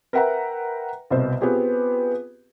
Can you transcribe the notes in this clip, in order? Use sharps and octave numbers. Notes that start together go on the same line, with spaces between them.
A#4 B4 E5 F#5 G5 A#5
C2 B2 C5
B3 C4 F4 G4 G#4